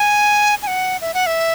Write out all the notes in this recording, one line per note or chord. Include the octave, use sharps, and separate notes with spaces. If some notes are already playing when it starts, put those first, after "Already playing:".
Already playing: G#5
G#5
F#5
E5
F#5
E5